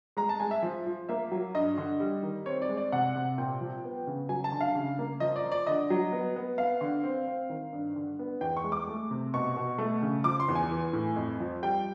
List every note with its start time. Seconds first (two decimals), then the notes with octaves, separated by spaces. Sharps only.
0.17 G#3 A#5
0.29 A5
0.40 G#3 G#5
0.51 E5
0.63 F3
0.86 F3
1.09 A#3 E5
1.32 F#3
1.55 G2 D#5
1.78 D3
2.00 G3
2.23 D#3
2.46 C4 C#5
2.62 D5
2.69 G#3
2.77 D5
2.92 C3 F#5
3.15 C3
3.38 A#2 G5
3.61 F3
3.84 B3
4.07 C#3
4.29 F#3 G#5
4.44 A5
4.52 D3
4.61 F5
4.75 C#3
4.99 A#3
5.20 F3 D#5
5.36 D5
5.44 F3
5.52 D5
5.67 D3 D#5
5.90 F#3
6.12 B3
6.36 B3
6.58 B3 F5
6.81 D3
7.04 C4
7.28 C4
7.49 D#3
7.73 G2
7.96 D3
8.19 B3
8.41 E2 G5
8.57 C#6
8.64 G#3
8.72 D6
8.87 A3
9.11 C3
9.34 B2 C#6
9.56 B2
9.78 A3
10.02 C#3
10.24 F3 D6
10.40 C6
10.48 E2
10.55 G#5
10.71 E3
10.93 A2
11.16 F2
11.40 F3
11.63 G3 G5